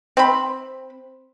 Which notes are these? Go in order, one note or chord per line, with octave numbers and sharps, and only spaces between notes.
C4 B5